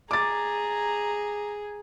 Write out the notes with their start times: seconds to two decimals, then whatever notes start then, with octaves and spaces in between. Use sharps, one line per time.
0.11 G#4 A#5 D6 A6